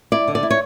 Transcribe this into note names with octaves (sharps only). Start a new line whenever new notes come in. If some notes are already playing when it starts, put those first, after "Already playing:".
E4 D5
D3
D5
E4
C#5